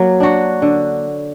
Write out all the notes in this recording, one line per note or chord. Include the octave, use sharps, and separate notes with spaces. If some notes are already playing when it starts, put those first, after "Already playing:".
Already playing: F#3 A#3
D4 F#4
D3